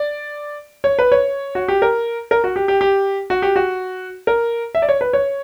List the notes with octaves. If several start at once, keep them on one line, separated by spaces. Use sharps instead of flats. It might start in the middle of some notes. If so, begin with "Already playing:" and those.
Already playing: D5
C#5
B4
C#5
F#4
G4
A#4
A#4
F#4
G4
G4
G4
F#4
G4
F#4
A#4
E5
D5
C#5
B4
C#5